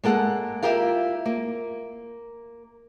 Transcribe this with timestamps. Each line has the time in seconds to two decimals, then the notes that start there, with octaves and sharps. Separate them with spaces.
0.04 G#3 A#3 A4 F#5
0.62 E4 F4 G4 A#4 F5
1.26 A#3